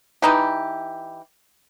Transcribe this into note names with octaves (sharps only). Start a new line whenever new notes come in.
E3 D#4 G4